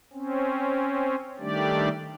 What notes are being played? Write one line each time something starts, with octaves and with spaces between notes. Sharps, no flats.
C4 C#4
D#3 G3 A3 D4 G4 D5